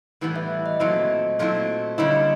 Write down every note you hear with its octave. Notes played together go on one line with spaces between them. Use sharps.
A2 E3 G3 B3
E5
D#5
A#2 F#3 A3 C4 E4
A#2 F#3 A3 C4 E4
D3 G3 A#3 C#4 E4 D#5